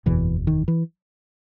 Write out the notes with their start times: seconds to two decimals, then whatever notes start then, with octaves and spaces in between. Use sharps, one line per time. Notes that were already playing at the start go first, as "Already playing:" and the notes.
0.06 F#1 E2 B2 E3
0.47 D#3
0.68 E3